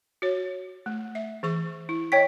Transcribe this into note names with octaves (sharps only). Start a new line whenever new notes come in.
F#4 C#5
A3
E5
E3 G#4 C#6
E4
C#5 D#5 G5 C#6 B6